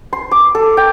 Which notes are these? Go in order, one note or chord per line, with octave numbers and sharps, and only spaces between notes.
C6
D6
A4
G5